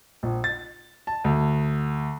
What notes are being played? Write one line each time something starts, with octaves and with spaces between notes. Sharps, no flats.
A#1
A6
A5
D2